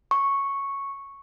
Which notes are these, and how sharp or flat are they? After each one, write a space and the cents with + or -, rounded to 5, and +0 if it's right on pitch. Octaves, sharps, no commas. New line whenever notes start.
C#6 -5